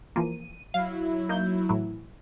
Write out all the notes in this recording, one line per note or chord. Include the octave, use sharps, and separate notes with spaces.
E3 F3 A#3 D#7
F#3 E4 F5
A#3 D#4 G6
A2 E3 F#3